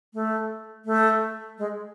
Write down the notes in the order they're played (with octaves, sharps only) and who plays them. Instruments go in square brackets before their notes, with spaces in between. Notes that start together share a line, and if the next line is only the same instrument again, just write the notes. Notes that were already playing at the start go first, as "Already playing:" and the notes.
[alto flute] A3
A3
G#3